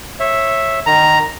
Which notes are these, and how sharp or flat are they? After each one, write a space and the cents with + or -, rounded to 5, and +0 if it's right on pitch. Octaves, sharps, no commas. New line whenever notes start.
C#5 -25 E5 +0
D#3 -20 A#5 +0